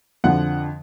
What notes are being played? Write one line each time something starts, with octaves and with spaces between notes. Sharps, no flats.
F2 D3 F3 F#5